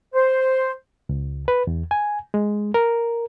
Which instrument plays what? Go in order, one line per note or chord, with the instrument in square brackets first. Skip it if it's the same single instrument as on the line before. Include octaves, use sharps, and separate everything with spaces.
[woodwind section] C5
[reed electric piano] C#2
B4
E2
G#5
G#3
A#4